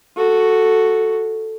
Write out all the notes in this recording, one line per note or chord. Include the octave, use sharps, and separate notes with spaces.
F#4 A4